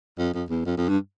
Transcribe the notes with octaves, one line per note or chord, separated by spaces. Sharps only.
F2
F2
E2
F2
F2
G2